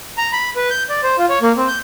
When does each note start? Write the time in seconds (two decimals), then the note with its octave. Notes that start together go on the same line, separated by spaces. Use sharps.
0.18 A#5
0.32 B5
0.56 B4
0.70 G6
0.89 D5
1.03 C5
1.18 F4
1.29 C#5
1.42 A#3
1.57 C4
1.68 G6